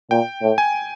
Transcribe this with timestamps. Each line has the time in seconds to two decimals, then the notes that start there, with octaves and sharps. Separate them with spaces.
0.11 A#2 G5
0.42 A2
0.58 G#5